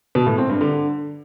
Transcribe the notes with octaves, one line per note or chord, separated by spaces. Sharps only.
B2
A2
C4
G2
D3